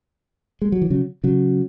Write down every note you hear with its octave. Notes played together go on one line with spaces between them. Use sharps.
G#3
F#3
E3
C#3 F#3
C#3 F#3